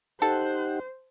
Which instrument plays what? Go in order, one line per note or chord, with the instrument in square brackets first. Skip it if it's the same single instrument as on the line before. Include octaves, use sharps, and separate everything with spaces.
[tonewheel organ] D#4 G4 F#5 [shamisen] A4 [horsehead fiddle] C5